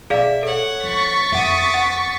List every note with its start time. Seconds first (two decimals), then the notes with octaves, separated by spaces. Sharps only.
0.10 B2 G#4 D5 E5 F5
0.43 A4 C#5 F#5
0.84 F3 D#4 C#6 A6 B6
1.32 F2 E5 F#5 D6 D#6
1.74 F#5